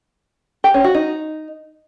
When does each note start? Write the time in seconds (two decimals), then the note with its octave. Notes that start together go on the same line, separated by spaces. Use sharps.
0.64 G4
0.74 C#4
0.84 F#4
0.95 D#4